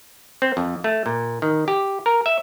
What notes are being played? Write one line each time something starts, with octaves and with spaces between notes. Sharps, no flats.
C4
F2
A3
A#2
D#3
G4
A#4
E5